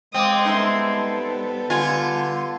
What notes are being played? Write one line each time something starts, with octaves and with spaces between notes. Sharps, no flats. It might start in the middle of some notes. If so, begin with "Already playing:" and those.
G#3 C4 F5 G5 D6 D#6
G3 B3 D#4 A4 E5 C6
D3 F4 G#5